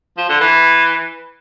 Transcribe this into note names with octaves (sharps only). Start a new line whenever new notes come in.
F3
D3
E3